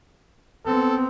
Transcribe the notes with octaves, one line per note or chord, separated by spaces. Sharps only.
B3 C4 A4